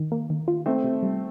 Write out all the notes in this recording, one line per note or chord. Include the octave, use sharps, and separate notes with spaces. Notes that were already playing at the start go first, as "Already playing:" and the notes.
Already playing: D#3
A#3
D#3
F4
A3 C4 D#4
C3
G3